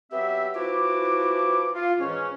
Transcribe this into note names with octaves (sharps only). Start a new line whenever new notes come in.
F#3 B3 C4 G4 E5
E3 F3 E4 F#4 D6
F4
G#2 E3 C#4